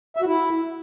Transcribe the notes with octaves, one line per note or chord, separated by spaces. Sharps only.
E5
F#4
E4